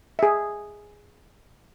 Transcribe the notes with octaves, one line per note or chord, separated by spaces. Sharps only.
G#4 E5